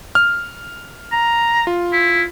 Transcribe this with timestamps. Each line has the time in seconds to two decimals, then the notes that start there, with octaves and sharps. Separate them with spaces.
0.15 F6
1.12 A#5
1.67 F4
1.93 E4